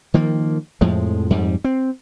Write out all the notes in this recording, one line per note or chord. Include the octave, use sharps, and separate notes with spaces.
D#3 F3 A#3
F2 A2 F3 G#3
F2 G#2 G3
C4